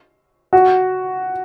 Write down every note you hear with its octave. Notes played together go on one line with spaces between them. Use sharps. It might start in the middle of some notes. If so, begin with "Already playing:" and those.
F#4